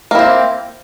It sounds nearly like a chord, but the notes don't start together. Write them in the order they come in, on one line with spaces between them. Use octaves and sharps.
A#3 E4 C4